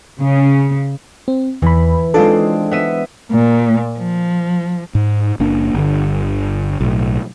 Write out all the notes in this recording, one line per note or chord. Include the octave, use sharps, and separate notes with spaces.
C#3
C4
E2 E3 B5
G#3 C4 D4 F4 A4
B3 E5 D#7
A#2
F3
G#2
F#1 A#3 D4
G1 D3
B1 A2